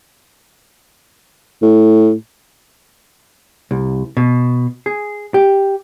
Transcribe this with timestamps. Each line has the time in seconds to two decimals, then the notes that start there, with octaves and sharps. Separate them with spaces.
1.62 A2
3.71 C2
4.17 B2
4.86 G#4
5.34 G4